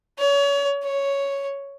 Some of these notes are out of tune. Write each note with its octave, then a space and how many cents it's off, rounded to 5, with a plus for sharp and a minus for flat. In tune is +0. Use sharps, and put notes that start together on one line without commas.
C#5 +30
C#5 +5